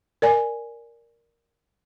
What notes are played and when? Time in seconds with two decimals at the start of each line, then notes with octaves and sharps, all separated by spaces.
0.22 A#4 D5 G#5